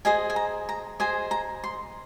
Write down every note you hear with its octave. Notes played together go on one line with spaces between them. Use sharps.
G#4 C5 D#5 G#5
G#5
A#5
A#5
G#4 C5 D#5 G#5
A#5
C6